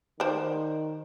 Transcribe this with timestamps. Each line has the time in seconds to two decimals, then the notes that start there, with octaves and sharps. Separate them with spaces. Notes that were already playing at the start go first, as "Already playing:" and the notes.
0.20 D#3 C5 D5